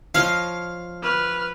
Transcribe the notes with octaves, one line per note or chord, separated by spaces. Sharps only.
F3 C#5 D#5 F5
B4 F6